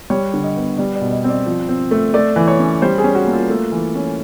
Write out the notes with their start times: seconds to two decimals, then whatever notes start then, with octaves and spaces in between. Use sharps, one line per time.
0.10 G3 C#5
0.34 D3
0.44 D#5
0.56 B3
0.78 G3 D5
0.96 D5
1.01 B2
1.12 D#5
1.24 C4 D5
1.46 F3
1.69 C4
1.91 A3
2.14 A3 D5
2.36 E3
2.48 C#5
2.60 C#4
2.82 G3 C5
2.98 G#4
3.04 C#4
3.15 F#4
3.27 A#3
3.33 F4
3.50 A3
3.72 E3
3.95 C#4